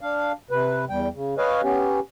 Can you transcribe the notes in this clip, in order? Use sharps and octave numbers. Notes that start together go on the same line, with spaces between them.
D4 F5
C3 B4
E2 G3 G5
C#3
B4 C#5 D#5 F5 G#5
B3 C#4 G4